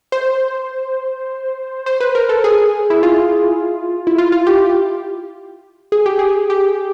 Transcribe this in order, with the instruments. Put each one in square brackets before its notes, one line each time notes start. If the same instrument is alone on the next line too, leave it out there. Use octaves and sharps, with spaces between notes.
[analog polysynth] C5
C5
B4
A#4
A4
G#4
E4
F4
E4
F4
F4
G4
G#4
G4
G#4
G4